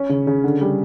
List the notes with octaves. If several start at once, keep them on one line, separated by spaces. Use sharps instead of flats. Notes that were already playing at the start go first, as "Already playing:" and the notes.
Already playing: C#4
C#3
C#3
D3
G3